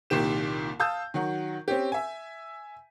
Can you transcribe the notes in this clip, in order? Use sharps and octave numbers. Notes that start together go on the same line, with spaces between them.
C2 A#2 D#3 G4 E7
F5 A5 D#6 E6 G6
D#3 F#3 F#4
C4 C#4 G4
E5 G#5